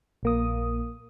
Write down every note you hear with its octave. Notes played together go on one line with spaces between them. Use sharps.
A#1 A#3 D#6